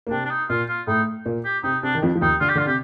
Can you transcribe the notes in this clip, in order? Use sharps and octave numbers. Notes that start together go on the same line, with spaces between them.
A#3
C3 C4 D4
D4
D#4
A#2 A#3 F4
F4
A2 A3 D#4
A#2 A#3
G4
C3 C4 D#4
C3 C4 D4
D#3
F2 F3
F3
D#2 D#3 D#4
D3 F4
G4
D3 F4
C3 G4